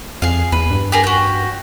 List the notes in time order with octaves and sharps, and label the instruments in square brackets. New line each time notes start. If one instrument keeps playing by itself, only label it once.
[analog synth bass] F2 [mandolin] G#4 F5
[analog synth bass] E2 [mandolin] B4
[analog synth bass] G2
[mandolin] G4 G#4 A#4
F#4 G4